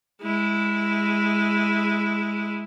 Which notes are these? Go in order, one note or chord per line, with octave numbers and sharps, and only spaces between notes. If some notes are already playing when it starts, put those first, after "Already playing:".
G#3 E4